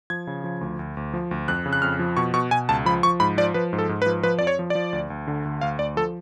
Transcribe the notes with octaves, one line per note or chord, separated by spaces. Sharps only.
F3 G#6
C#3
F3
D2
D2
D2
F3
D2
F2 F#6
C#3
F#6
F2 F6
F3
B2 C#6
B2 C#6
B2 G#5
C#2 A5
F3 B5
F3 C#6
G#2 B5
F3 D5
F3 B4
G#2
A4
G#2
B4
F3
F3 B4
F2 D5
C#5
F3
F3 D5
D2
D2
D3
D2
D2 F5
D2 D5
F3 A4